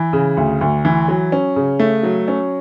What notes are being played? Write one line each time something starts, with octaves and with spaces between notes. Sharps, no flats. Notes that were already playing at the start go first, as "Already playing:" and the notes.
Already playing: E3
C#3
D2
D2
E3
F#3
C#4
C#3
A3
F#3
C#4